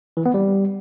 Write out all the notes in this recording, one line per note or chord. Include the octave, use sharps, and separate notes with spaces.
E3
B3
G3